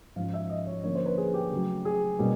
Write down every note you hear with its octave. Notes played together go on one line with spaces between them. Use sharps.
G#2 F3 G#3 C#4 F5
E5
D#5
C#5
D3 F3 A#3 C#4 C#5
C5
B4
G#4
G4
C#3 F#3 A3
G#4
B2 G3 A#3 C#4